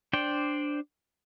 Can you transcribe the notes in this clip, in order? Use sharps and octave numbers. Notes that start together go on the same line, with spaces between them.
D4 C5 D5 G5